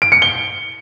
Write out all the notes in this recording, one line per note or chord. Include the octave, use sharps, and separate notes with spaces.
D7
C#7
G7